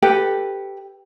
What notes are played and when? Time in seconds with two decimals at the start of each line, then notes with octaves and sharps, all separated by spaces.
0.02 G4 A4 B4 G5